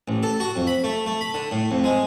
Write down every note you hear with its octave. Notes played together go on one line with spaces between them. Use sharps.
A1
A4
F#4
F2
B5
A3
A3
B5
D3
A2
F2
G#3